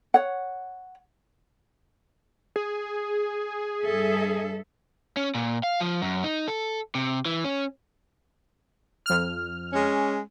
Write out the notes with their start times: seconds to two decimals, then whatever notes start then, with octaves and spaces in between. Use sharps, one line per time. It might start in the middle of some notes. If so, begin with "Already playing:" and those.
0.14 C#5 F#5
2.56 G#4
3.83 G2 A4 E5
5.17 C#4
5.35 A#2
5.63 F5
5.81 F3
6.02 F#2
6.24 D#4
6.48 A4
6.95 C3
7.25 E3
7.45 C#4
9.06 F2 F6
9.73 G#3 C#4